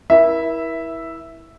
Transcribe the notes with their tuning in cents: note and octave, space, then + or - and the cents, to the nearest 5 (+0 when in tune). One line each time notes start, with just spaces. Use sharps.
E4 -15 A#4 +40 E5 +0